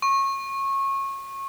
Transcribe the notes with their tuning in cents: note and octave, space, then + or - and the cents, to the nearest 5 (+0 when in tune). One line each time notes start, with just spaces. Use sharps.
C#6 -25